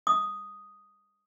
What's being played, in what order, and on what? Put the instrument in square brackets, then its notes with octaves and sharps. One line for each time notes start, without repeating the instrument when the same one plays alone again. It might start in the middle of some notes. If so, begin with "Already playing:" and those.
[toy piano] D#6